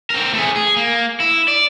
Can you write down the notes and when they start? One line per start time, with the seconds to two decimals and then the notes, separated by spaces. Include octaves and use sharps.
0.10 C4 A#4
0.34 A3 G#4
0.56 G#4
0.77 A#3
1.20 E4
1.48 D5